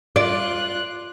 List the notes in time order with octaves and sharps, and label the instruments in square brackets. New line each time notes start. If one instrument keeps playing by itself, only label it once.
[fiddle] F4 F#6 [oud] D5